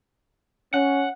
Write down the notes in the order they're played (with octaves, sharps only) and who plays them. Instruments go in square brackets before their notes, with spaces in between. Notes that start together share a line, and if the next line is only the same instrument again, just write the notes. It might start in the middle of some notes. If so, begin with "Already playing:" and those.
[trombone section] C#4 [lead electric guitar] F#5